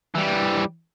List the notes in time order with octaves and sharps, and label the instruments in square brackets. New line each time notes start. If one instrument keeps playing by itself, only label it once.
[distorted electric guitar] E3 G3